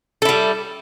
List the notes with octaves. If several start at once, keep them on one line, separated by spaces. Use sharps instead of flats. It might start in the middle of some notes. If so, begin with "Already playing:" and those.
G3 E4 A4